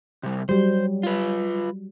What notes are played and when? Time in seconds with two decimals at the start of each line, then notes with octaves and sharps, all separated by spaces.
0.23 C3 G3
0.49 F#3 G3 C5
1.03 F4 B4